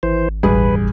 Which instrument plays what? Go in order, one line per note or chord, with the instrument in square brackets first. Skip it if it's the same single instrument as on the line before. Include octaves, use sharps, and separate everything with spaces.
[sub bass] G#1 [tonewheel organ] E3 C5
[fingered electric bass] E1 A1 [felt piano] G2 G#4 [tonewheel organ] B4